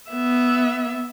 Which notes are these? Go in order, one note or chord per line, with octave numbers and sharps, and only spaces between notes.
B3 E5